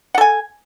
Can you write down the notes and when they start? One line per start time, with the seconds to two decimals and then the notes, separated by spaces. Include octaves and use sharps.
0.15 F#5
0.18 A4
0.21 G#5